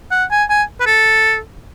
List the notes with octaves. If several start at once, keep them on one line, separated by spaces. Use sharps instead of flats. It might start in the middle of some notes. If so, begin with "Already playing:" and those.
F#5
G#5
G#5
B4
A4